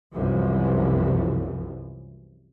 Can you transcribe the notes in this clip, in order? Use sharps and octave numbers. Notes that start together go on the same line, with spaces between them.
C2 F#2 E3 F3